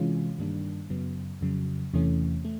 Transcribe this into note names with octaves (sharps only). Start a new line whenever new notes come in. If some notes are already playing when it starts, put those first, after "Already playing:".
Already playing: C3 E3 G#3 C#4 F4
G2 D#3 G3 A#3 D4
F#2 C#3 F#3 B3
F2 C#3 F#3
E2 C3 E3 A3 C#4
A3